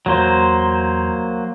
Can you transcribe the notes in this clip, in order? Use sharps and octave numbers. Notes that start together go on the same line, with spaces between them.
E2 F#3 A#3 C5